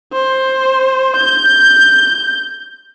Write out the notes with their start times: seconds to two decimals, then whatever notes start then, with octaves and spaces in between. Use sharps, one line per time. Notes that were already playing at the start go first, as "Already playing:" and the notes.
0.13 C5
1.16 G6